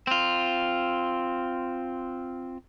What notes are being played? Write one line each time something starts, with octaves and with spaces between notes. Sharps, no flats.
C4 F4